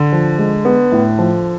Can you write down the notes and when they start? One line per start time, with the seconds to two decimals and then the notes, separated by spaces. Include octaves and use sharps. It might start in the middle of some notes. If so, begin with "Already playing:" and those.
Already playing: D3
0.12 F3
0.38 G#3
0.65 B3
0.92 A2
1.19 F3